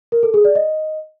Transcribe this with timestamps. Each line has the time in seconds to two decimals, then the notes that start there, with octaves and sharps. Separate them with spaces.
0.12 A#4
0.23 A4
0.34 G#4
0.45 D5
0.55 D#5